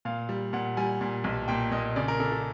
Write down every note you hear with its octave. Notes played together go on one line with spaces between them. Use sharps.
A#2 F5
G3
A#2 F#5
G3 G#5
A#2
B1
A#2 G5
A#2 D#5
C#3 D5
A#4
C#3 A4
A4